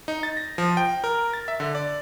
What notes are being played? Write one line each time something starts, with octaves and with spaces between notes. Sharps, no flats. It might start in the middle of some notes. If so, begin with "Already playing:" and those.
D#4
A6
A#6
F3
G5
A#4
A6
E5
D3
D5